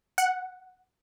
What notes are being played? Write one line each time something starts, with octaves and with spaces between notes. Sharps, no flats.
F#5